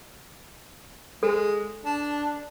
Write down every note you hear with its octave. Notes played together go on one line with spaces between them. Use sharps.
G#3 A4
D4